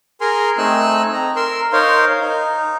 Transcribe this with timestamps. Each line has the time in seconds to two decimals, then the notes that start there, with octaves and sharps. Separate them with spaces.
0.21 G#4 A#4 G#5 A#5 C6
0.58 A3 C4 D#4 G#5 E6 F#6
1.13 A#5
1.36 A#4 C6 E6
1.73 D#4 A#4 C5 C#5 F5 C6
2.21 D#4